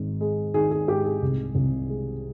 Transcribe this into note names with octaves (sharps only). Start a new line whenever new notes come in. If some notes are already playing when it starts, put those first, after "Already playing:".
Already playing: G#1 G#2
G#3
D#3 G#4
G#4
G#2 G4
G#4
C2
C2
G#3